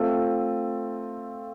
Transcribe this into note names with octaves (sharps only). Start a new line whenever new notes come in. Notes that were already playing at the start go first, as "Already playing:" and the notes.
Already playing: A3 C4 F4 A4